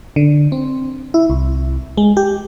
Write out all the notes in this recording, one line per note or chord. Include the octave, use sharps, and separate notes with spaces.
D3
C4
E4
C2
G#3
G4